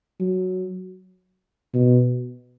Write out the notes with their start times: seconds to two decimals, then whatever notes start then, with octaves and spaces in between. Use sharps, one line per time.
0.20 F#3
1.74 B2